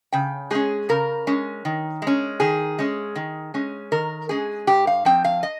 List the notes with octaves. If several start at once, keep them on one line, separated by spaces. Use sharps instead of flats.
C#3 G5
G#3 C#4 G#4
C#3 A#4
G#3 C#4
D#3
G#3 C#4
D#3 G#4
G#3 C#4
D#3
G#3 C#4
D#3 A#4
G#3 C#4 G#4
G2 G4
F5
F3 C4 G5
F5
D#5